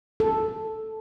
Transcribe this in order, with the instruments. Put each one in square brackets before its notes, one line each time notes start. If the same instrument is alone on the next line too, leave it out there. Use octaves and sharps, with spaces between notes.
[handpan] A4